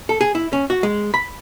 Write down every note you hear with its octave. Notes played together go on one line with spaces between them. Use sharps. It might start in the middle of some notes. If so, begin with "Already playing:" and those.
A4
G#4
E4
C#4
F#4
G#3
B5